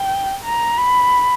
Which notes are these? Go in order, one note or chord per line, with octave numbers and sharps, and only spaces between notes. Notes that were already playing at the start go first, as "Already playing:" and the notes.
Already playing: G5
A#5
B5